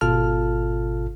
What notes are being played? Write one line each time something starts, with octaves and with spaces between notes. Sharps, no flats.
G#1 B2 F4 A4 A5 F6